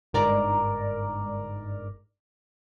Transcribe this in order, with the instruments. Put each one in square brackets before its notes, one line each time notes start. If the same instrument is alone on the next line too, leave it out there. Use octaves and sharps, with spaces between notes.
[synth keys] G1 G#2 A#4 D5 A#5